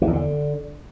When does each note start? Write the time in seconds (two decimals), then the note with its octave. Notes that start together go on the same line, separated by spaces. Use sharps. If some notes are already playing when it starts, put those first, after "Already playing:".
0.02 E3
0.07 E2
0.13 D3